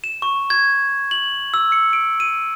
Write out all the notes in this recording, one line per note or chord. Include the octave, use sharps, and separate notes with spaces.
E7
C#6
G#6
F#7
E6
C#7
D7
D#7